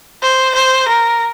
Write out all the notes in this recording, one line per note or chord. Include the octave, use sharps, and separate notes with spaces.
C5
C5
A#4